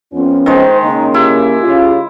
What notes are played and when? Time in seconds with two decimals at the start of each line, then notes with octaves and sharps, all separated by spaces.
0.13 F2 B3 C#4 F4
0.46 D#3 G#3 C5
0.83 C#3 A#3 D#4
1.14 E4 G4
1.62 C#3 F4